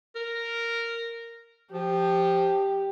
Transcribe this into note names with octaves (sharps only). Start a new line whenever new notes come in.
A#4
F3 G4